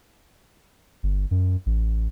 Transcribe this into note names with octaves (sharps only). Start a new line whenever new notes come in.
G1
F#2
A1